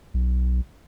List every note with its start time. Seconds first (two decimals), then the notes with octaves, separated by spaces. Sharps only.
0.14 B1